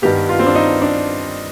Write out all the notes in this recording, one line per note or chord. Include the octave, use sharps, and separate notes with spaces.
G2 D#3 B3 G4
F4
C4
D4
D#4
D4